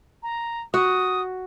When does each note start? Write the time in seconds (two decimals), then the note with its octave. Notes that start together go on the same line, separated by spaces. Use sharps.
0.23 A#5
0.74 F#4 D#6